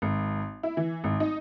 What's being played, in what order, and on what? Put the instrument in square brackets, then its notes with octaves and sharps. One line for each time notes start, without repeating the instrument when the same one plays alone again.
[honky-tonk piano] G#1
E4
E3
G#1
D#4